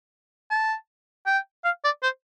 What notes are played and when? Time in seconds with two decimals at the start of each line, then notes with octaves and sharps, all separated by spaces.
0.50 A5
1.26 G5
1.65 F5
1.84 D5
2.03 C5